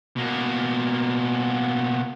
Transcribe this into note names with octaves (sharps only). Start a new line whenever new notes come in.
B2 A#3